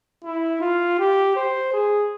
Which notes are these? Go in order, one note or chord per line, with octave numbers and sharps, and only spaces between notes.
E4
F4
G4
C5
G#4